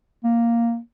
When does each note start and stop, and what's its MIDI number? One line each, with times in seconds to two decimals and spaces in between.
0.24 0.78 58